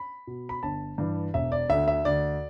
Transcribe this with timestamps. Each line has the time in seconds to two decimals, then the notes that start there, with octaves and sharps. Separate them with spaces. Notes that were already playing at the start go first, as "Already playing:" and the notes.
Already playing: B5
0.27 B2
0.49 B5
0.63 G1 A5
0.98 G2 E3
1.34 E1 E5
1.52 D5
1.69 D2 D3 E5
1.88 E5
2.05 D2 D5